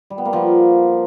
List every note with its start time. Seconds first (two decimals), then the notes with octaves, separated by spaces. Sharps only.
0.10 G3
0.18 B3
0.25 A#3
0.33 F3